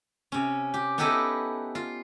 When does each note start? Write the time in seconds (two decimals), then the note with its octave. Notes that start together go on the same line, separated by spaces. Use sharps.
0.32 C3 C#4
0.74 G4
0.98 B3 D#4 E4 G4 A4 D#5
1.75 F4